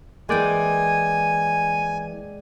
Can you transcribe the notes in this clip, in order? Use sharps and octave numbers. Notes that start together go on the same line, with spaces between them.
E3 G#3 A#3 D5 G5 G#5